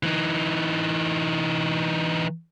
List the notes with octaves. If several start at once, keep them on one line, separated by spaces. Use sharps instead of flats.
E3 D#4